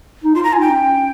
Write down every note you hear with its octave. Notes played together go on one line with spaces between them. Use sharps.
D#4
F4 C6
A#5
G#5
D#4 G5
C#4